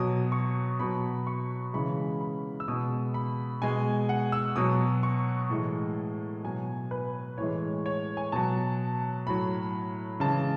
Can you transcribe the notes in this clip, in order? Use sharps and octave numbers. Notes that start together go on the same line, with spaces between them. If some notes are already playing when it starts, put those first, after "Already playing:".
Already playing: B2 F#3 D#6
C#6
B2 F#3 B5
C#6
C#3 E3 G#3 B5
B5
E6
B2 G#3 D#6
B5
B2 G#3 G#5
F#5
E6
B2 F#3 D#6
C#6
A2 E3 G#3
B2 F#3 G#5
B4
A2 E3 G#3 C#5
C#5
G#5
B2 F#3 A5
A2 F#3 B5
C#3 E3 G#3 A5